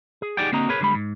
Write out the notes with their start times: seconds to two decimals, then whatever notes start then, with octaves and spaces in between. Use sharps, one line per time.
0.22 G#4
0.37 D#4 G4 G#4 D5 F#5 G5
0.52 D3 A#3 C4 F#4 D#5 A#5
0.69 G#4 A#4 B4 C#5
0.81 D3 G3 G#3 B5
0.95 G#2